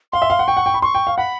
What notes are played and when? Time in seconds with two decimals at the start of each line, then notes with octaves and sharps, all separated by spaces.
0.12 F5 C6
0.22 E5
0.30 F5
0.39 F#5
0.48 G5 C#6
0.57 F#5
0.66 G5
0.74 B5
0.82 C6 C#6
0.95 G5
1.07 F5
1.18 F#5 B5